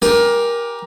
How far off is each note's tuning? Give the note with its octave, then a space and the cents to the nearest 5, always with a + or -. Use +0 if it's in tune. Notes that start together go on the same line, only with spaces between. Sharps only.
G4 +0 A#4 +20 G#5 -25